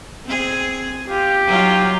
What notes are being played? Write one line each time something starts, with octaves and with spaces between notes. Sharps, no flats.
C4 G#4
F4 G4
F#3 D#4 F4